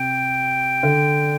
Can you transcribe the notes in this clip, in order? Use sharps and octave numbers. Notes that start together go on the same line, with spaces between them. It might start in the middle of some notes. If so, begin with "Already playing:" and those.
Already playing: C3 G5
D3